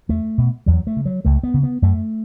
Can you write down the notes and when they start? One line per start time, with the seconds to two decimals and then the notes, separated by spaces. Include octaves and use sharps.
0.09 E2 A3
0.38 B2
0.66 E2 F#3
0.87 A3
0.96 C#3
1.05 F#3
1.25 C#2 A3
1.43 B3
1.54 C#3
1.63 B3
1.82 F#2 A3